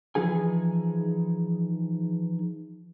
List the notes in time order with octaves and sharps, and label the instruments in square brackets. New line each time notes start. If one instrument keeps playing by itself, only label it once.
[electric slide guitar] E3 F3 D#4 G#4 G#5